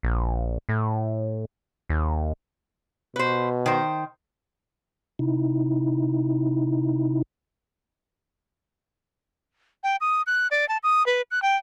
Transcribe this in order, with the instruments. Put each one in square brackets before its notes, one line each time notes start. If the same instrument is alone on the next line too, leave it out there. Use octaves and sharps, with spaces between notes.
[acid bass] A#1
A2
D#2
[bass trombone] B2 [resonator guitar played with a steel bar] B4 C5
[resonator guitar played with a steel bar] D#3 C5
[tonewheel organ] C3 D#4 E4
[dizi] G5
D#6
F#6
D5
A5
D#6
B4
F#6
G5